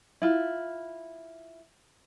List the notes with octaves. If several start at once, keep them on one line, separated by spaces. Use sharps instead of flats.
E4 F4